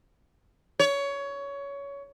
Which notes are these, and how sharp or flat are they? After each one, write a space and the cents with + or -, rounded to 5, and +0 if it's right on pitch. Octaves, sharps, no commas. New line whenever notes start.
C#5 +20